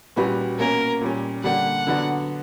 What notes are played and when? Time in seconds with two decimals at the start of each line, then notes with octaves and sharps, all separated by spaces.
0.16 A#2 G3 C#4 F#4 B4
0.59 B2 A#3 C#4 A#4
1.01 A#2 G3 C#4
1.43 D3 G3 A#3 D4 G4 F#5
1.87 D3 F#3 B3 D4 F#4